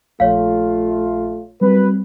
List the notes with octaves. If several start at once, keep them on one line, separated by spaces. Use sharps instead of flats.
A#1 A3 F4 C#5 F5
F#2 G3 C4 B4